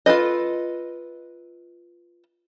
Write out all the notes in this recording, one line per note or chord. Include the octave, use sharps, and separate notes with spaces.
F4 A4 B4 D#5